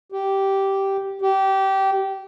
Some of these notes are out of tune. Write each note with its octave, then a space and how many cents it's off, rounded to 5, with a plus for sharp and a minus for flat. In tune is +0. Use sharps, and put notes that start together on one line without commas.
G4 -10
G4 -20